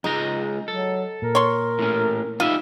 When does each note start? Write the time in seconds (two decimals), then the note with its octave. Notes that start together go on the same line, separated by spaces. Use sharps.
0.04 C#2 G#3 D#4 A#5
0.68 F#3 A4
1.22 A#2 A#4
1.35 C#5 C6
1.79 A2 C#4
2.40 G3 D#4 F4 E5